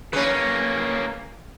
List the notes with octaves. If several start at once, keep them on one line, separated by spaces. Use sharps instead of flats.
C#3 A#3 C#4 B4